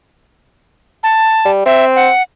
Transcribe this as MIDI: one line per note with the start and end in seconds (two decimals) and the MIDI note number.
1.03 1.51 81
1.45 1.63 55
1.66 2.09 60
1.66 1.85 76
1.96 2.22 78